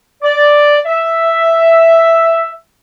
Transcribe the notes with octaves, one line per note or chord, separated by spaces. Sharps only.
D5
E5